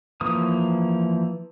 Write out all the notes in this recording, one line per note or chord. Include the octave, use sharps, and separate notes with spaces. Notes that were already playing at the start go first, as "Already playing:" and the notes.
E3 F3 A#3 D#6